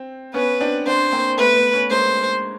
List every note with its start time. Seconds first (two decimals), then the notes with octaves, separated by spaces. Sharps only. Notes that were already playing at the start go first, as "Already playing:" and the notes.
Already playing: C4
0.34 B3 C#4 B4
0.60 C4 D4
0.87 C4 D4 C5
1.12 A#3 C4
1.38 A3 B3 B4
1.56 A3 B3
1.73 B3 C#4
1.91 G#3 A#3 C5